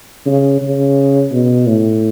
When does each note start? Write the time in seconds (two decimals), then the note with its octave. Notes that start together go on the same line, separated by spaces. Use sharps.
0.26 C#3
0.62 C#3
1.32 B2
1.67 A2